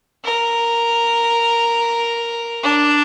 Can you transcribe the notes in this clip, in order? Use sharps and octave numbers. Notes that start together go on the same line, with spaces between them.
A#4
D4